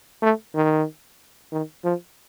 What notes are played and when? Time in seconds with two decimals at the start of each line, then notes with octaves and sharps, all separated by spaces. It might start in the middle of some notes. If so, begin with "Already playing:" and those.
0.22 A3
0.55 D#3
1.52 D#3
1.84 F3